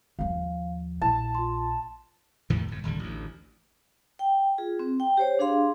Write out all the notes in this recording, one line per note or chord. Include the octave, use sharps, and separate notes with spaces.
D#2 F3 F5
A#1 E4 A5
F4 C6
E2 A2 D#3 E3
G1 G#2
D#1 G#1 D3 G3
A1 D2
G5
F4 G#4
C4
G5
G4 C5 C#5
D4 G#4 F5 C6